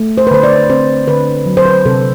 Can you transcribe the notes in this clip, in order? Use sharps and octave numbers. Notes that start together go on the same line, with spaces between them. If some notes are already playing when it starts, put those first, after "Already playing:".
Already playing: A3
C5
B4
D3 C5
D5
C4 C5
D3 B4
F#3
C5
B4
C3 A4